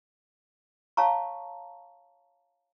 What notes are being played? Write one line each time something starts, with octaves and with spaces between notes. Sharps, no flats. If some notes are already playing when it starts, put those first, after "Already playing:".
C#5 F5 A5 A#5 C#6